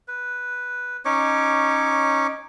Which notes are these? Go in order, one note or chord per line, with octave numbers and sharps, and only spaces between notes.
B4
C#4 D#4 C#5 D6